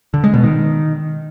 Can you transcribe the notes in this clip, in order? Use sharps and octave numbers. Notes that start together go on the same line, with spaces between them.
D3
G#3
B2
D#3